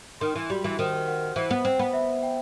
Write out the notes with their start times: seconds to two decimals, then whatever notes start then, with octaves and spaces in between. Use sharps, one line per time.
0.21 D#3 C6
0.35 E3
0.50 G3 F#4
0.64 E3
0.79 D#3 C5
1.07 F#5
1.36 E3 C5
1.51 B3
1.65 C4 C5
1.79 B3
1.93 E5
2.23 G5